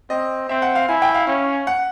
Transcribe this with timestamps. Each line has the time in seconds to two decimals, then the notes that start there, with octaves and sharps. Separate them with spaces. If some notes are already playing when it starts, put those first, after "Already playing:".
0.10 C4 D#5
0.49 C4 E5
0.62 F#5
0.75 F5
0.88 E4 G#5
1.02 G5
1.14 F5
1.27 C#4
1.67 F#5